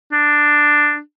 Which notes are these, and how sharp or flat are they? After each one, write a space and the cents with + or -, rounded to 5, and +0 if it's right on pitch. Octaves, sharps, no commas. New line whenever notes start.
D4 +5